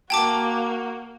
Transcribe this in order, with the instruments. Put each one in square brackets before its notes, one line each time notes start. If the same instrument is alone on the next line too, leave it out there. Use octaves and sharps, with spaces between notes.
[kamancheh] A#3 F#4 [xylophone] G5 A5 D6